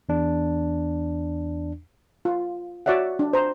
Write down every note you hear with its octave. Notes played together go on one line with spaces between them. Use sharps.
E2 D4
F4
F#4 C#5 D5 E5 F#5
D4
C5 A#5